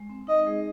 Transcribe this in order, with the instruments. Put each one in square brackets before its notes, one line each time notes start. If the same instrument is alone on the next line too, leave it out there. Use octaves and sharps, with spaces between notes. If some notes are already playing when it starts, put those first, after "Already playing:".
Already playing: [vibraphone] G#3
C4
[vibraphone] D#4 [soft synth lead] D#5
[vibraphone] G#3 G#4